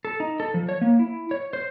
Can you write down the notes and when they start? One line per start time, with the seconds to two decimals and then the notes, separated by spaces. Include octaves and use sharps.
0.05 A4
0.20 D#4
0.40 A4
0.54 F3
0.69 C#5
0.81 A#3
0.99 E4
1.31 C#5
1.53 C5